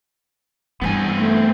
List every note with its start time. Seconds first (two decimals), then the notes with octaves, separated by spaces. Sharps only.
0.81 G2 E3 B3 C4 G#5
1.16 A3